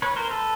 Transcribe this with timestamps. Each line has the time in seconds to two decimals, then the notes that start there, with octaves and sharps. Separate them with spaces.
0.02 B4 C#5
0.16 A#4 C5
0.30 A4 B4